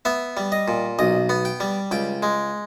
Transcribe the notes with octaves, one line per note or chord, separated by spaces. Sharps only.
B3 E5
G3
D#5
A#2
B1 D#5
B3
G5
G3
C#2 G5
G#3